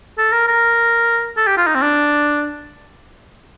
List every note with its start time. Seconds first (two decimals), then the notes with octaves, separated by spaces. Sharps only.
0.18 A4
0.32 A#4
0.48 A#4
1.37 A4
1.47 G4
1.57 F4
1.67 D#4
1.75 C4
1.82 D4